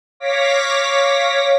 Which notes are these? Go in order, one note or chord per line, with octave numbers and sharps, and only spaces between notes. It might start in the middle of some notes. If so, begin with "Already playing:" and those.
C#5 F5 D6 A#6 B6